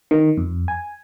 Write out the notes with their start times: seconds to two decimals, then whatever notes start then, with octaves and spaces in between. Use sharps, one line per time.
0.11 D#3
0.37 F2
0.68 G#5